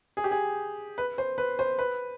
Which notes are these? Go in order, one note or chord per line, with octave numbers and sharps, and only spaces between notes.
G#4
G4
G#4
B4
C5
B4
C5
B4